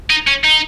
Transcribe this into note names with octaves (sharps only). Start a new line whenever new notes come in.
D#4
C#4
D#4